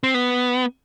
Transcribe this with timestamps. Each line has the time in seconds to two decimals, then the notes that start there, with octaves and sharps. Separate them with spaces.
0.03 C4
0.14 B3